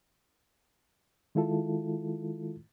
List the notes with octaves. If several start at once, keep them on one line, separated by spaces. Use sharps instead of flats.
D#3 G#3 E4 F4 A4